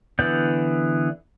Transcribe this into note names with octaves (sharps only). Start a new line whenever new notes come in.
D3 E3 B3 D5 G6